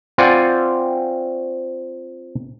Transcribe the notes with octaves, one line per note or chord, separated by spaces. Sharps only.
C4 F4 D5 F#5 G#5